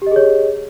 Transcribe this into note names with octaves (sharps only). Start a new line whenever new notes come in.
G4 G#4 C#5 D#5